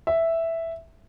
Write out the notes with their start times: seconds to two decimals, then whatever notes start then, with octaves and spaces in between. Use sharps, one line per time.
0.07 E5